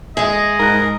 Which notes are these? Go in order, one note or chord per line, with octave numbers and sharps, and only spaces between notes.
G#3 G#4 D#5 E5
G#2 A#4 F#6